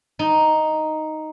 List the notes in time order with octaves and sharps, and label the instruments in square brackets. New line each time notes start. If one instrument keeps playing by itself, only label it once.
[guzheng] D#4